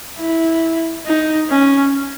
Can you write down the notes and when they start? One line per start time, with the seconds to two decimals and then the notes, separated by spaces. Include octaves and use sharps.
0.18 E4
1.06 D#4
1.50 C#4